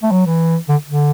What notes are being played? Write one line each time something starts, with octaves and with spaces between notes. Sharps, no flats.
A3
F#3
E3
D3
D3